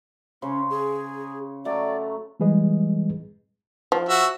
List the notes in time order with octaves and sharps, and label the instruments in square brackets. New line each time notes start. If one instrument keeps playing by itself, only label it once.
[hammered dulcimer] C#3 C5 [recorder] C#4
[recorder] G#4
[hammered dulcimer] F#3 A3 [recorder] D5
[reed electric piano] E3 G3 G#3 G#4 B4 D#5
[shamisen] F3
[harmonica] F#4 E5